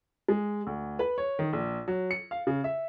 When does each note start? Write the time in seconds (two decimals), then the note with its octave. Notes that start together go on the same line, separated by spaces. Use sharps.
0.28 G#3
0.67 D2
0.99 B4
1.18 C#5
1.39 D#3
1.53 A#1
1.88 F#3
2.11 C#7
2.31 F5
2.47 C#3
2.64 E5